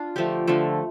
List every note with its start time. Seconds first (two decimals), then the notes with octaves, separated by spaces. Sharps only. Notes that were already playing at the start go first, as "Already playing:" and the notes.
Already playing: D4 F4
0.16 D3 F3 A3 G4
0.47 D3 F3 A3